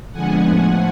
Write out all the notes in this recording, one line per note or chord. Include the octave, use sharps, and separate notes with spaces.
F2 D3 F3 G#3 B3 F#5 G#5
A2 F3 A3